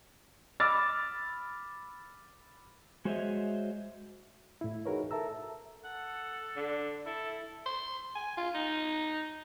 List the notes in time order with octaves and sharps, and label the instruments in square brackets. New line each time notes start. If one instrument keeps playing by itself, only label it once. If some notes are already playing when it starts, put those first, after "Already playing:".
[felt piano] B5 D6 E6 F6 A6
[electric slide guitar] G#3 F#4 C5 C#5 D#5 E5
[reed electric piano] A2 E4
D#4 F#4 G#4 A#4 B4 C#5
A4 A#4 E5 A5 A#5 E6
[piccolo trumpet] A4 [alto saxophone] F#5
[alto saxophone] D3
[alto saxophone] E4 [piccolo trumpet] A4
[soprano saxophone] C6
G#5
F4
D#4